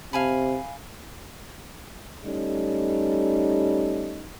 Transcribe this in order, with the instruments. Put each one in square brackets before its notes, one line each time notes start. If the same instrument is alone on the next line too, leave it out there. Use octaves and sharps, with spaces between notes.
[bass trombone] C3 [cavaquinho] F5 G#5 B5
[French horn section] G3 A3 C#4 D#4